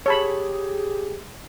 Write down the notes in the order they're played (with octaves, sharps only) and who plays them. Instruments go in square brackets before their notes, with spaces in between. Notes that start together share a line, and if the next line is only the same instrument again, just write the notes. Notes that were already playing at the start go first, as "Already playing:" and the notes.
[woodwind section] G4 G#4 [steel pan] C#5 A5 B5